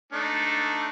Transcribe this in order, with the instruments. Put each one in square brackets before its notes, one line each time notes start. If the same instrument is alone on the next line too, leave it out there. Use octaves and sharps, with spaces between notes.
[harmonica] A3 D4 D#4